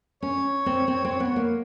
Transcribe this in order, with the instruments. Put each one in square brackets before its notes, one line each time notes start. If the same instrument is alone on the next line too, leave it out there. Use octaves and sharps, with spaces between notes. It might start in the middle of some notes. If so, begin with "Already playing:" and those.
[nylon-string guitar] C#4 [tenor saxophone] C#5
[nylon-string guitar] C4
C4
C4
B3
A#3